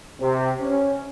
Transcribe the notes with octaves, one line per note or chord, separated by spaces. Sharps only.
C3
C#4